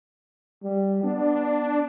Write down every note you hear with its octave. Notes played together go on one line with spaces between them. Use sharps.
G3
B3 D4